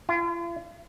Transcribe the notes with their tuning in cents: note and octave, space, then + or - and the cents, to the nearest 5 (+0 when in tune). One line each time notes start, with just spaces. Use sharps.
F4 -45